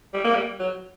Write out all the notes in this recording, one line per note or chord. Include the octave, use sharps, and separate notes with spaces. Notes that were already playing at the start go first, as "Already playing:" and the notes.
G3
A#3
G3
F#3